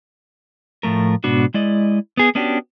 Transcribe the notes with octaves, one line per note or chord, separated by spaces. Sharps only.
A2 F3 A3 A#4
G#2 B2 B3 D4 F#4
G#3 E4 D5 D#5
B3 G#4
B3 C#4 D4 F#4 G4